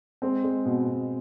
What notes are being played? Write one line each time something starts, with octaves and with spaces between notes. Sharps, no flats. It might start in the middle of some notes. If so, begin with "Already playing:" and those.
G#3 C4
G#3
B2
B2